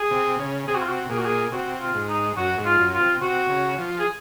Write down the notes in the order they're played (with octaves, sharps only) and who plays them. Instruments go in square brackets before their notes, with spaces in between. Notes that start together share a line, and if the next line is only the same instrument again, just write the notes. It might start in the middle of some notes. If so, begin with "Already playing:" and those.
Already playing: [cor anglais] G#4
[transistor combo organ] C3
C#3
[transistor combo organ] C3 [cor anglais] G#4
[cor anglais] F#4
F4
F#4
[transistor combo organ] A#2 [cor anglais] G#4
[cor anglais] F#4
G#4
[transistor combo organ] C3 [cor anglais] F#4
[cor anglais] F4
[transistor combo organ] G#2
[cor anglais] D#4
[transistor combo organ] F#2 [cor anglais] F#4
[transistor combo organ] G#2
[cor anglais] F4
[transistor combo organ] F#2
[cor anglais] F4
[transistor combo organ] C3
[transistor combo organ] C3 [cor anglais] F#4
[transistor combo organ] C#3
F3
[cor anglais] G#4